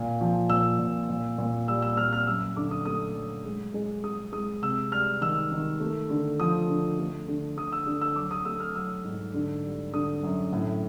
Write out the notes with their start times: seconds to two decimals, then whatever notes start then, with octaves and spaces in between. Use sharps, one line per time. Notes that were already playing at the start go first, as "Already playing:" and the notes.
Already playing: A#2
0.21 F3
0.49 A#2 E6
0.79 A#2
1.09 A#2
1.38 A#2
1.68 G3 E6
1.82 E6
1.97 A#2 F6
2.13 F6
2.27 F#2 E6
2.56 D3 D6
2.71 D#6
2.85 A3 D#6
3.15 F#3
3.45 G#3
3.74 G#3
4.04 G#3 D#6
4.32 G#3 D#6
4.62 C3 E6
4.92 G3 F6
5.21 D#3 E6
5.52 D#3
5.80 A3
6.10 D3
6.40 F3 D#6
6.69 D3
6.99 A3
7.28 D3
7.57 D3 D#6
7.72 E6
7.86 D3
8.01 E6
8.16 F#3 D6
8.31 D#6
8.45 A3 E6
8.60 F6
8.75 F#3 E6
9.04 G#2
9.34 D3
9.64 G3
9.93 D3 D#6
10.23 F#2
10.53 A2